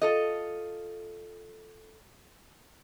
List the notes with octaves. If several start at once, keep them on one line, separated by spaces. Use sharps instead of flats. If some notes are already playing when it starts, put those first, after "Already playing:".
F4 A4 D#5